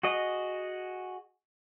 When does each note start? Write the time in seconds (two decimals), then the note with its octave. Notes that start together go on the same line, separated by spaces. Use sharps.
0.03 F#4 G#4 D#5